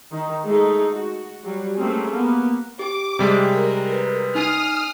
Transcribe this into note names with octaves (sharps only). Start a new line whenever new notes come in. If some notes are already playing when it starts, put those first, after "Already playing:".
D#3 D#4
G#3 A3 D#4 G#4
F#4
F#3 G3
A3 A#3 C4 C#4 G#4
A#3 B3
G4 D6
C3 G3 G#3
A#4
B4
D#4 G#5 D#6 F6 C7